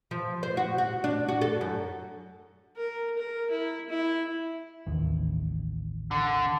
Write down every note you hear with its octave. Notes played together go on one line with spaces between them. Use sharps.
F3
C5
F#4
F#4
D4
F#4
A4
F#2
A#4
A#4
E4
E4
A1 D#2
D3